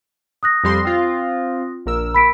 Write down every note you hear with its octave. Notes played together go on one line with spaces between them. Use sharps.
D#6 F#6 A#6
F2 G3 C6
C4 F4
A#1 A#4 E6
B5 B6 D7